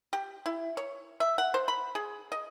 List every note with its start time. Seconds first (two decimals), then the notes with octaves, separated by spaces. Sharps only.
0.13 G4
0.46 E4
0.77 C#5
1.20 E5
1.38 F#5
1.54 C5
1.68 B5
1.95 G#4
2.32 D#5